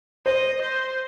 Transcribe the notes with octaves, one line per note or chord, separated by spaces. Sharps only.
C5 D#5
C5